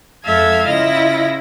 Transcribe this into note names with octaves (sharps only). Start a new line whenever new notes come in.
F2 G#3 A4 E5 F5 G#6
C#3 E4 F4 D#5 A#6